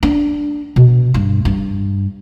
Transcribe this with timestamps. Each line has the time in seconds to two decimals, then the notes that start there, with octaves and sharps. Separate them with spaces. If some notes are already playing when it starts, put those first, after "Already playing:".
0.03 D4
0.76 B2
1.14 G2
1.45 G2